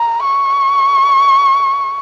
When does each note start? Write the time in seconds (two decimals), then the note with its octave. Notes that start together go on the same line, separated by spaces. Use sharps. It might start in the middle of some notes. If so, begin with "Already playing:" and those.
Already playing: A#5
0.24 C#6